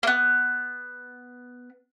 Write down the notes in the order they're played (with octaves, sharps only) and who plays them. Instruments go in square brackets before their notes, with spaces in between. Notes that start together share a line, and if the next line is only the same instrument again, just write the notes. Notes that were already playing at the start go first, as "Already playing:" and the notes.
[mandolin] A#3 B3